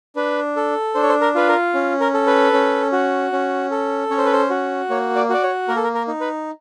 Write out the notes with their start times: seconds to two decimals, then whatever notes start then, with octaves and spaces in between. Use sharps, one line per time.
0.16 D4 B4
0.56 A4
0.95 D4 C5
1.03 C#5
1.09 C5
1.21 A#4
1.35 F4 B4
1.48 A#4
1.74 C#4
2.00 A#4
2.14 A4
2.27 B4
2.53 C#4
2.92 F#4
3.33 C#4
3.71 A4
4.11 C#4 C#5
4.18 C5
4.25 B4
4.33 C5
4.50 F#4
4.89 A#3 C#5
5.16 D5
5.29 F#4 D5
5.43 C#5
5.68 A#3 A#4
5.76 A4
5.84 A#4
5.95 A#4
6.08 D#4
6.21 B4